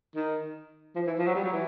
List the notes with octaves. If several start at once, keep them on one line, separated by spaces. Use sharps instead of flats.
D#3
F3
E3
F3
F#3
G3
F#3
E3